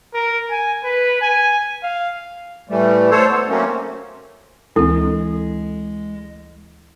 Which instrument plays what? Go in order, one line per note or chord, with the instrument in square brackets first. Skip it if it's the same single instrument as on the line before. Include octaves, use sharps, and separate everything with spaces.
[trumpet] A#4
G#5
B4
G#5
F5
[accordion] A2 E3 G3 A3
A3 A4 C5 C#5
B3
D#3 F#3 A3 A#3 C4 C#4
[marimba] D2 E3 C4 [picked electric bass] G#3 [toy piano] E4 A4